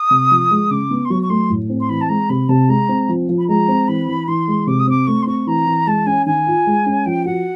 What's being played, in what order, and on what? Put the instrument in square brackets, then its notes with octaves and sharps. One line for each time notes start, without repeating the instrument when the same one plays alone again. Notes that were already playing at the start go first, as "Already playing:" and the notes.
Already playing: [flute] D#6
[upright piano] C3
F3
G#3
[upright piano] C#3 [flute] D6
[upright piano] B3
[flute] C6
[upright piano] F#3 [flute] C#6
[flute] C#6
[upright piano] A3 [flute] C6
[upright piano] A2
C4
[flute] C6
[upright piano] E3 [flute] B5
[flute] A5
[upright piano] G#3 [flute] A#5
[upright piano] C3 [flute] B5
[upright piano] C3 [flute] A5
[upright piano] G#3 [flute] A#5
[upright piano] C4
F3
F3
[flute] B5
[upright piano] G#3 [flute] A#5
[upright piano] C4
[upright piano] E3 [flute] B5
[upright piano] E3
[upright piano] E3 [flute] C6
[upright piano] G#3
[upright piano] C3 [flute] D6
[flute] D#6
[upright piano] C4 [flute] D6
[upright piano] A3 [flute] C#6
[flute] C6
[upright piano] C4 [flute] C#6
[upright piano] E3 [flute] A#5
[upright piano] E3
[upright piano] G#3 [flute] A5
[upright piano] C#4 [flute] G#5
[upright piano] D#3 [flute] G#5
[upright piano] F4
G#3
C#4
[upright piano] F3 [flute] G5
[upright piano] F#4 [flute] F#5